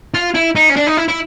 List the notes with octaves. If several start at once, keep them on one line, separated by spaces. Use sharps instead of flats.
F4
E4
D#4
C#4
D4
D#4
E4
E4